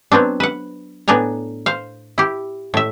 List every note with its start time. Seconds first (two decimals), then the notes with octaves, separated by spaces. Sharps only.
0.12 F#3 B3 C4 D4
0.40 B4 F#5
1.08 A2 B3 D4 G#5 A#5
1.66 C5 F5
2.18 E4 G4
2.74 A2 E5